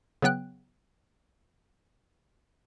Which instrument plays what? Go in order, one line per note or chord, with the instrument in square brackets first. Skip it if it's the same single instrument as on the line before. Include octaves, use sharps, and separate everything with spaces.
[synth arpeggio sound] C#3 F#3 B3 G5 F#6